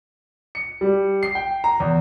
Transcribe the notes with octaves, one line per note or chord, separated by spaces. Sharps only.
C#7
G3
C7
G5
A#5
E2